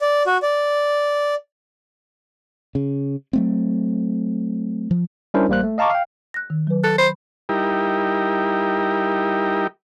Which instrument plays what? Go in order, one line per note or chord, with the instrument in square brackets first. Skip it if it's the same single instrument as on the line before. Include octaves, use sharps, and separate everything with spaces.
[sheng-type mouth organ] D5
F#4
D5
[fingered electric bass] C#3
F#3 A3 C4
F3
[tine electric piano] G3 C#4 D4 E4 A#4 C5
A1 G3 A#3 C5 F#6
A3
D#5 F5 A5 A#5 C#6 D6
F5 G5
[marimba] F#6 A#6
D#3
F#3 B4
[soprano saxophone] A4 [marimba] F#6
[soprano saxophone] C5 [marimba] B5
[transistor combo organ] G3 D#4 E4 G4 A#4